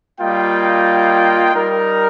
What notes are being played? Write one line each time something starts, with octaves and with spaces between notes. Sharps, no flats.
G3 A#3 F4 D#5 G5
G3 D#4 A#4